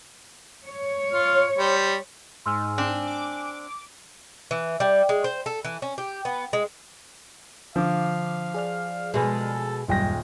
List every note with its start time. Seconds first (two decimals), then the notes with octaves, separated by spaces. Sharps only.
0.66 C#5
1.13 F4 F6
1.58 G3 C5
2.46 G#2 G#5 C6 E6 F6
2.78 C4 D4
3.07 D6
4.51 E3
4.80 G3
5.09 G#3
5.24 C5
5.46 A4
5.65 E3
5.82 C#4
5.98 G4
6.25 B3
6.53 G#3
7.76 D3 F3 F5 D6
8.54 G#4 D5 F6
9.14 B2 G#3 A4
9.88 D#1 F#2 G3 G#3 G5 A#6